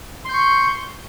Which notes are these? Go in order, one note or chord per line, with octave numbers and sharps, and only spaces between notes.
C6 C#6 G6